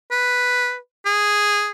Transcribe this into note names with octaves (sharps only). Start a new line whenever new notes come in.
B4
G#4